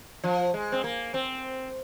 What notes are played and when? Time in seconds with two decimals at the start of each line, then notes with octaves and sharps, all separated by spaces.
0.24 F3
0.54 G#3
0.72 C4
0.84 A#3
1.14 C4